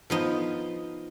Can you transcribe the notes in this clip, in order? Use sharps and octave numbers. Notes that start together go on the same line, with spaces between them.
F3 B3 D#4